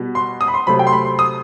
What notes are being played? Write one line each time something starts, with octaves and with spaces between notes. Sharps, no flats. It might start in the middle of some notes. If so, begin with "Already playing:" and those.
Already playing: B2 G3 B3
C6
D#6
B5
C6
C3 F#3 A3 C4 B5
G5
C6
B5
C6
D#6